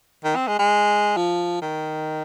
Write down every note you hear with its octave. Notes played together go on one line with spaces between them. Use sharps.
D#3
C4
G#3
G#3
F3
D#3